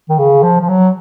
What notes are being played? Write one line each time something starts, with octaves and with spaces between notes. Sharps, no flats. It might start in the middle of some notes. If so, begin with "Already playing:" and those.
D#3
C#3
F3
F3
F#3